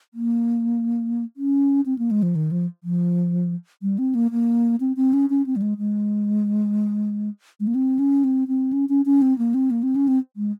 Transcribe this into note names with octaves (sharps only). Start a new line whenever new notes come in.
A#3
C#4
C4
A#3
G#3
F3
D#3
F3
F3
G3
C4
A#3
A#3
C4
C4
C#4
C#4
C4
G3
G#3
G#3
G#3
A#3
C4
C#4
C4
C4
C#4
C#4
C#4
C4
A#3
C4
A#3
C4
C#4
C4
G#3